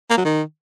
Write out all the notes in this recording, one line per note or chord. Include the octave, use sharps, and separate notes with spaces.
A#3
F#3
D#3